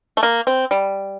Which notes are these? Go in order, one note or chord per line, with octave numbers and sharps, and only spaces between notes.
A3
A#3
C4
G3